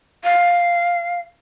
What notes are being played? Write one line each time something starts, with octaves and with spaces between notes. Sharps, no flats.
F5